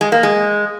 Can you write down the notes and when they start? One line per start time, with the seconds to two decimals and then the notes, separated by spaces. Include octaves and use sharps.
0.01 G#3
0.12 A#3
0.23 G#3